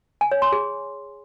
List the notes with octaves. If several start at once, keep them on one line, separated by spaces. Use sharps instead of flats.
G#5
C#5
C6
G#4